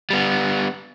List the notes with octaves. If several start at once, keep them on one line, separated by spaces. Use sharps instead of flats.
G3 B3